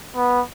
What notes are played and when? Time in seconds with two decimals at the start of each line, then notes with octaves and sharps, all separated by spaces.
0.16 B3